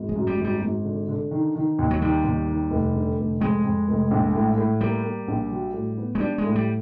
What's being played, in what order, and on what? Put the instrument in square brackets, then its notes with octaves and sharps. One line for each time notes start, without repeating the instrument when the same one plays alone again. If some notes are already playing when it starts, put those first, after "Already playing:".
Already playing: [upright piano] G#1
[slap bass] G#3
[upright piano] F#2
[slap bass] G3
[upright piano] G#1
[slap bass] G3
[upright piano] G#1
D3
D3
D#3
D#3
D#2
[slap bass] F#3
[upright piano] D#3 [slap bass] G3
[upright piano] D#2
D#3
F1
D3
F1
[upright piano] F2 [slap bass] G#3
[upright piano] F2
F1
A#1
A2
A2
[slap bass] G3 [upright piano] A#3
[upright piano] A#3
A#1
F#3
A2
B3
[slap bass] G#3
[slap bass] G3 [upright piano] D4
[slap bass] G#3
[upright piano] A2
[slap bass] G3